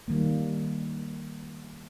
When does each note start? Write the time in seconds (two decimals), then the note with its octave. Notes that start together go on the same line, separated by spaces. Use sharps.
0.08 D#3 G3 A#3